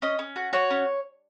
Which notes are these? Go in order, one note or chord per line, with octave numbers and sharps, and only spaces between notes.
C#4 D#5
C#4
F#4
F#4 C#5
C#4